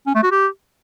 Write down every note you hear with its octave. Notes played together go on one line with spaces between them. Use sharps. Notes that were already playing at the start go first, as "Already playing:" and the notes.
C#4
A3
F#4
G4